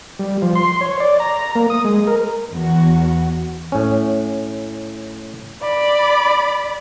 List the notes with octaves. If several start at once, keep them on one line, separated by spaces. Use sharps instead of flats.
G3
F3
C6
C#5
D5
A#5
A#3
D#6
G#3
A#4
E2 F#4
A2 C#4
D5 B5